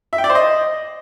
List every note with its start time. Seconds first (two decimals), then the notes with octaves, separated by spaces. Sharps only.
0.13 E5
0.18 G5
0.24 D5
0.30 C5
0.35 D#5